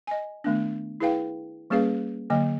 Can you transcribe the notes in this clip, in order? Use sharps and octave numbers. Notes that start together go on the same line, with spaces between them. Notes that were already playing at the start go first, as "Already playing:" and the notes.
D#5 G#5
D#3 A3 B3 D4
E4 G#4 B4 F5 G5
G3 A#3 C#4 G#4 B4 F5
D3 F#3 A#3 D#5